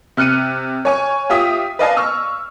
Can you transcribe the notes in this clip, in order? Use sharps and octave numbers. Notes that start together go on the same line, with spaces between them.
C3 F6 F#6 C#7 D#7
C#5 G#5 C#6
F4 G4 E5 D#6 B6
B4 D5 D#5 F5 G#5 A5
C#6 E6 F6